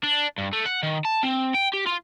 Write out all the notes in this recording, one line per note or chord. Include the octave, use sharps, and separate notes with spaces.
D4
G2
A3
F#5
D#3
A5
C4
G5
G4
F4